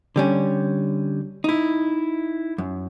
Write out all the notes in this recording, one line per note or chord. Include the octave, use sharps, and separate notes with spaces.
D3 G3 C#4
D#4 E4
F#2